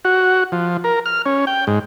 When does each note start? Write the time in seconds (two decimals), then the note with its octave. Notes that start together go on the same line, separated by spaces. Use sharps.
0.05 F#4
0.52 F3
0.84 A#4
1.06 F6
1.26 C#4
1.47 G5
1.67 G#2